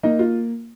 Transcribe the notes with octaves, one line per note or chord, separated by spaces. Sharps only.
A#3 D#4
F4